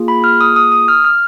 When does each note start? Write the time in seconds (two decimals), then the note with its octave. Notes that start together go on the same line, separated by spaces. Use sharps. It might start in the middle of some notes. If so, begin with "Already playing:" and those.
Already playing: A#3 F4 G#4
0.08 B5
0.24 F6
0.41 D#6
0.56 D#6
0.72 D#6
0.88 F6
1.04 F6